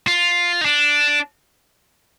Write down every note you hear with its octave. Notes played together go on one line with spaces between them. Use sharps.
F4
D#4
D4